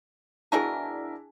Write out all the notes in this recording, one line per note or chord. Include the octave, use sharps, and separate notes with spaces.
B2 D4 E4 F#4 G#4 A#4 G#5 A5